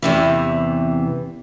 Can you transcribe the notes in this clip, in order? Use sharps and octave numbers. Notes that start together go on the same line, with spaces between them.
E2 C3 E3